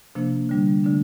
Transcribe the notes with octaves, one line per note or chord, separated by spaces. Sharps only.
C3 F3 A#3 D4
D3 G3 D4
D3 A3 D4